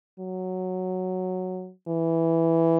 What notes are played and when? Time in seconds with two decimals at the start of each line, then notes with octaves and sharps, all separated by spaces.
0.19 F#3
1.88 E3